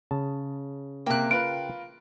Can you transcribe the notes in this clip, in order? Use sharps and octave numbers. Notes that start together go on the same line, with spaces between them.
C#3 A5
C3 A#3 G5 F#6
F4 A#4 B4 D7